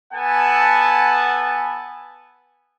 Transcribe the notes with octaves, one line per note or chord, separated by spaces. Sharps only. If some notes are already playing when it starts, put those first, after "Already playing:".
B3 A4 F#5 G#5 A5